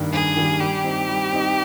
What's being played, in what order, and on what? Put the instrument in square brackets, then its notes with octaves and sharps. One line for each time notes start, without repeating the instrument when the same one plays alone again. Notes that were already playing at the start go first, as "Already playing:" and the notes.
Already playing: [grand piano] G2 D#3 G3 A#3
[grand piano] G2 [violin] G#4
[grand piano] D#3 G3 A#3
[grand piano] G3 [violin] G4
[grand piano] C4 D#4
G3
C4 D#4